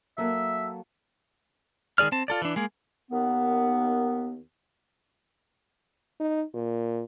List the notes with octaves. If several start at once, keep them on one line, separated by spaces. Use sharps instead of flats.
F#3 A#3 A4 E5
D#3 G#3 G#4 D5 F6
C4 A5
F4 A4 D5
E3 D4
G#3 A#3 G#4
D#2 D#3 B3
D#4
A#2